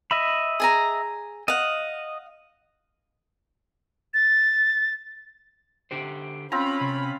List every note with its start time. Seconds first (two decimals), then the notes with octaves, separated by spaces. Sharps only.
0.11 D#5 E5 B5
0.60 G#4 G#5 A#5
1.48 D#5 F5 F#5
4.14 A6
5.91 D3 G4 C5
6.52 C4 C#4 F4 A#5 B5
6.81 C3